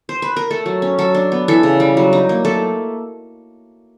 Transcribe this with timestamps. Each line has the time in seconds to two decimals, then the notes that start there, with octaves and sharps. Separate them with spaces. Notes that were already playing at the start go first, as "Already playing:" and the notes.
0.09 C5
0.22 B4
0.36 A#4
0.50 A3 A4
0.66 F#3
0.82 C#4
0.99 F#3 A4
1.15 D4
1.32 B3
1.48 E3 A4
1.63 C#3
1.80 G3
1.97 F#3
2.13 D#4
2.29 A#3
2.45 A3 A4